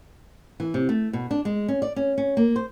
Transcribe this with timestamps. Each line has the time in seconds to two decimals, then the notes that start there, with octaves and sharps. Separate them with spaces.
0.60 E3
0.74 C3
0.89 A3
1.13 B2
1.31 D4
1.45 G#3
1.68 C#4
1.82 D5
1.96 C#4
2.18 C#4
2.37 A#3
2.56 C5